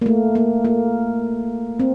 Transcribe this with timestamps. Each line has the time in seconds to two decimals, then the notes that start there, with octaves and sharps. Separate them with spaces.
0.01 A#3
0.06 A3
0.35 A#3
0.65 A#3
1.79 C4